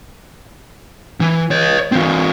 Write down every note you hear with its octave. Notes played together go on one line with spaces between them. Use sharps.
E3
C#5 D#5
E3 C4